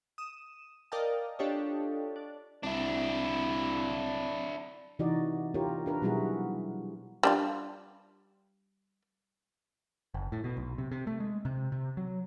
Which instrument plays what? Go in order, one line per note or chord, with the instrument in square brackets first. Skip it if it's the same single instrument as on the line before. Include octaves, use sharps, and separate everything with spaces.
[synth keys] D#6 E7
A#4 D5 D#5 F5 G5 A5
D4 F4 G4 A4 C#5 D#5
D4
[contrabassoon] C2 [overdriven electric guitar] D4 E4
[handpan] C3 E3 D#4 F#4 D5 D#5
F4 G4 A#4 C#5
D4 A#4 B4
B2 F#3 G3 E4 F#4 G#4
[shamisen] G3 D4 F4
[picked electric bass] F#1
A2
B2
B1
C3
C3
A3
G#3
C3
C3
F#3